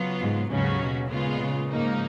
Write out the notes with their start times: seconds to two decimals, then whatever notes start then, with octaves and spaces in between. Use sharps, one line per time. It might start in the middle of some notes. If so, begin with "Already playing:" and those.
Already playing: C#3 F#3 B3 F4
0.19 G#2
0.50 D#2 G#2 C#3 F#3 C#4 F#4
0.79 B2
1.09 A#2 C#3 G#3 B3 F4
1.40 C#3
1.70 G#2 F3 A#3 D#4